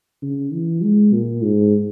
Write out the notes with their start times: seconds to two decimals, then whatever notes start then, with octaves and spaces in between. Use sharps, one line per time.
0.22 C#3
0.53 E3
0.83 G#3
1.13 A#2
1.43 G#2